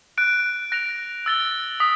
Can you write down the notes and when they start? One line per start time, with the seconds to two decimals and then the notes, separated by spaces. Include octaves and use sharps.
0.17 F#6 A6 D7
0.72 F#6 A#6 D7 F7
1.26 E6 A6 D7 G7
1.80 D#6 B6